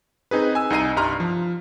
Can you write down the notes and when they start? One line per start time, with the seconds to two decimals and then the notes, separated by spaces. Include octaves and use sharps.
0.31 C4 D#4 G#4 B4
0.55 G#5 E6
0.70 C2 D#4 D#5 A#5 C7 D#7
0.96 C2 G2 A#5 C6 F6
1.20 F3